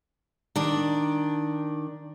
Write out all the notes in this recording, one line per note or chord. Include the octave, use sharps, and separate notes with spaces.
D#3 D4